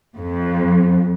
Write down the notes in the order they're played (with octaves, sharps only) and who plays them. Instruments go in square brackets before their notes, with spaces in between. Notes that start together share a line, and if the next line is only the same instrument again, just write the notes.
[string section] F2